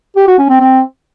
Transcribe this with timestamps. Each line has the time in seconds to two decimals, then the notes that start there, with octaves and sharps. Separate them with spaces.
0.16 G4
0.27 F#4
0.38 C#4
0.49 C4
0.60 C4